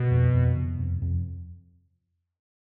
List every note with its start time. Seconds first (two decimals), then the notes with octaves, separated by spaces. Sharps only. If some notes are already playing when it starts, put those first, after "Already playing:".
Already playing: B2
0.11 F2
0.34 F2
0.56 C3
0.79 F2
1.02 F2